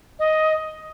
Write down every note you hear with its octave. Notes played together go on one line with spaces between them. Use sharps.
D#5